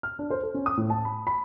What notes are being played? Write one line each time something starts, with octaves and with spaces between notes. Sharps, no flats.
F6
D4
C5
A4
C#4
D#6
A2
A5
B5
B5